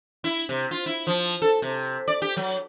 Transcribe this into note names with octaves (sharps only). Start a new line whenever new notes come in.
E4
C3
F4
E4
F3
A4
C3
D5
G4
F#3